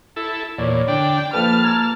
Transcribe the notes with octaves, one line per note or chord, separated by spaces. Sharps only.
E4 A4
E2 A#2 C#5 D5
D3 D4 G5
F3 A#3 A4 B4 A5 F6
A#5 G#6